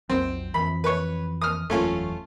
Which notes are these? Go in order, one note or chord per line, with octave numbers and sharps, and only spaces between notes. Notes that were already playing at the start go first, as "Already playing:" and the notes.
B1 F2 F#3 C4
F2 E3 B5
B4 C#5
D#6 F6
F#1 E2 F#3 A3 C#4 F4